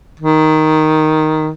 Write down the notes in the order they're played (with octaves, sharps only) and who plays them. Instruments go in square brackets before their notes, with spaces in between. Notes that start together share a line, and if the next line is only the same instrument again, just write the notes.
[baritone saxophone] D#3